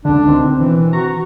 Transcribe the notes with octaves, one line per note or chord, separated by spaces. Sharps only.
C#2 D3 D4
B2 D#3 C4
E3
F#4 A#5 C#6